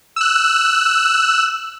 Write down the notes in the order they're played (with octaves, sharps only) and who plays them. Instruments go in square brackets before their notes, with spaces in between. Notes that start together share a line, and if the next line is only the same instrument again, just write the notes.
[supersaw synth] E6 F#6